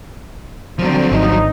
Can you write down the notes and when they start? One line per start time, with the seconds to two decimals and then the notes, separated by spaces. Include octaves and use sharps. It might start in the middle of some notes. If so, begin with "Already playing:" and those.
0.79 D3 F3 F#3 C4
1.12 G#1 D#4